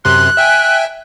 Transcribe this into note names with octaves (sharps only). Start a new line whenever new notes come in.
F#2 C3 C6 F#6
E5 G5 G#5